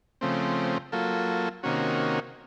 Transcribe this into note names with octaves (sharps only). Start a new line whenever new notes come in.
C#3 F3 A3 C4
F#3 A#3 F4 A4
C3 D#3 A#3 C#4 F#4